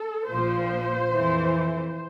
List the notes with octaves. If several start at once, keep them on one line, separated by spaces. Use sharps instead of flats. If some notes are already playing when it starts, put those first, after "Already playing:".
Already playing: A4
A#1 A#2 F3 C5
F2 E3